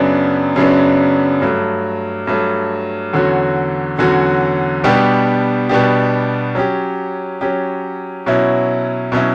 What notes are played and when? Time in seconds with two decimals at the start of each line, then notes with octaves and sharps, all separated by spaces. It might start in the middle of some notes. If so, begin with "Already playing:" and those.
Already playing: F#2 C#3 F#3 B3 D4
0.56 F#2 C#3 F#3 B3 D4
1.42 G2 F#3 A3
2.27 G2 F#3 A3
3.13 E2 D3 F#3 C#4 F#4
3.99 E2 D3 F#3 C#4 F#4
4.84 B2 G3 B3 D4 G4
5.69 B2 G3 B3 D4 G4
6.55 F#3 C#4 G4
7.41 F#3 C#4 G4
8.26 B2 F#3 C#4 E4
9.12 B2 F#3 C#4 E4